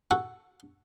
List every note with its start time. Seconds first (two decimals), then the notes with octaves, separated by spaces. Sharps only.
0.11 F#4 A4